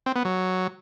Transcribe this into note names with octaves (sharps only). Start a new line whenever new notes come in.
C4
B3
F#3